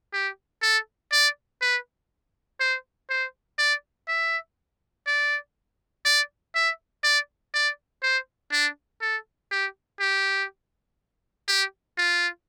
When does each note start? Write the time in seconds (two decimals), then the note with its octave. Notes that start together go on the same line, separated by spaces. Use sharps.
0.13 G4
0.62 A4
1.12 D5
1.62 B4
2.60 C5
3.10 C5
3.59 D5
4.08 E5
5.06 D5
6.05 D5
6.55 E5
7.04 D5
7.54 D5
8.03 C5
8.52 D4
9.01 A4
9.51 G4
10.00 G4
11.48 G4
11.98 F4